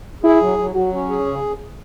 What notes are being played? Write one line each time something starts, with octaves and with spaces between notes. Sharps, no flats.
E4 G#4
F#3
F#3
F#3 F#4
C#4
G#4
C#3